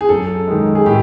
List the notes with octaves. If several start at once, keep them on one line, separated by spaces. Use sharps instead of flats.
G#4
F#2 A4
D#3 G#3
G#4
A2 G4